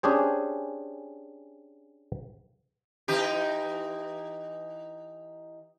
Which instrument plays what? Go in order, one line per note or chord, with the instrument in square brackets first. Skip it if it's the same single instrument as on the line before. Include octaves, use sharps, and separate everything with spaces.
[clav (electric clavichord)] C#4 D4 G4 G#4 C5
[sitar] E3 D#4 G4